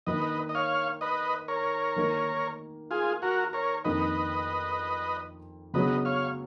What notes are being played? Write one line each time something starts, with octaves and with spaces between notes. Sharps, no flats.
D#3 A#3 D#4 B4 D#5
D#5
C#5 F5
B4 D#5
A#4 C#5
D#3 A#3 D#4
F4 G#4
F#4 A#4
A#4 C#5
F2 D#3 A#3 D#4 B4 D#5
C#3 F#3 B3 B4 D#5
C#5 F5